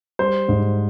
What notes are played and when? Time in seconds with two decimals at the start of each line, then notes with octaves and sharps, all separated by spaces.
0.19 G3 C5
0.49 G#2